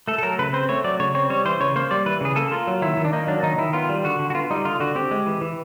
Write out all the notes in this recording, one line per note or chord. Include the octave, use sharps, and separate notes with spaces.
A3 A4
A4
F#3 A#4
C#3 B4
C4 C5
A3 C#5
F#3 D5
C#3 C#5
C4 C#5
G3 C#5
E3 C5
C#3 C#5
A#3 C5
G3 D5
E3 B4
C#3 G#4
A#3 A4
A#3 F4
F#3
D#3 E4
D#3
D4
A#3 D#4
F#3 D4
D#3 D#4
D#3 E4
B3 F4
G3
D3 F#4
D3
F#4
B3 F4
G3 D#4
D3 F4
D3 F#4
C4 G4
G#3
E3
E3